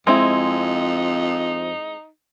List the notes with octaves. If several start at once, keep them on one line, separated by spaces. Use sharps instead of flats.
F2 G#3 C4 D#4 E4